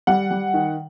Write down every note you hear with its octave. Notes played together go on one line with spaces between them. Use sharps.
G3 F#5
G3
D#3